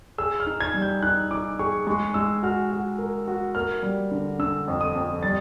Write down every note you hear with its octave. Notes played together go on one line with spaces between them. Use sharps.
G#4 E6
F6
D#4
G#6
G3
G6
D#4 F#6
D#4 D6
G#4 C#6
G#3 C#6
G#3 E6
F#4 F6
F#4
A#4
F#4
A#3 F6
G3
D3
D3 E6
F2
D#6
F2
G3 A6